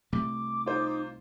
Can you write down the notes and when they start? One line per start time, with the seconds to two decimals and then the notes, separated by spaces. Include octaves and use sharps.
0.13 C2 C3 A3 D6
0.66 D#4 F4 C5